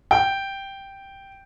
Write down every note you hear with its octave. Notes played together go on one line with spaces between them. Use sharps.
G5